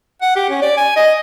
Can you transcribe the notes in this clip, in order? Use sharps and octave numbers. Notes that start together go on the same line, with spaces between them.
F#5
G4
C#4
D5
G#5
D#5